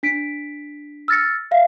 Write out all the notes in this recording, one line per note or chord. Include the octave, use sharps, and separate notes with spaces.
D4 B6 D7
E6 F6 A6 A#6 C#7
E5 F5